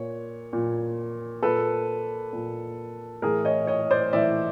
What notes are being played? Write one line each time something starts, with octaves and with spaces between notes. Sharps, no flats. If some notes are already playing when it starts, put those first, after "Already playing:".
Already playing: A#2 C#5
A#2
A#2 A4 B4
A#2
A2 E3 G#4 A#4
C#5 D#5
C#5 D#5
C5 D5
A2 E3 D5 E5